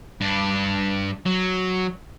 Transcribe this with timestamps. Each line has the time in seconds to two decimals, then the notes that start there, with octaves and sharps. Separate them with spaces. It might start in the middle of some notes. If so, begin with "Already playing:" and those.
0.21 G2 D4
1.26 F#3